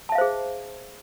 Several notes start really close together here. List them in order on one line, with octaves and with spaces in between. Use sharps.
A5 E5 F5 C5 G#4